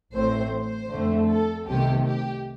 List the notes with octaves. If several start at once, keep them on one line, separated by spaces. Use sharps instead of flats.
A1 A2 A3 C4 C5
C5
F2 D3 A3 C4
A4
C2 C3 D#3 A3 G4
G4